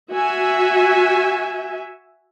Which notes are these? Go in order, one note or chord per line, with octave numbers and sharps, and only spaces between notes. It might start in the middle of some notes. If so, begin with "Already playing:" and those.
F#4 E5 G#5